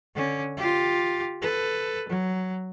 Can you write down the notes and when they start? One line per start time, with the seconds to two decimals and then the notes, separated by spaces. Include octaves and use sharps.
0.15 D3 C#4
0.57 F4 G4
1.42 A4 B4
2.09 F#3